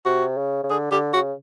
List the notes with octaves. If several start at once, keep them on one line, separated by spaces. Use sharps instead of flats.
C3 F#4
C#3
C#3
D3 G#4
D3 G4
C#3 F#4